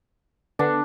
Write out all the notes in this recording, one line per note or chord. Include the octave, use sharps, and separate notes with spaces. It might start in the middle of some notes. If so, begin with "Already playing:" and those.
D3 B3 D4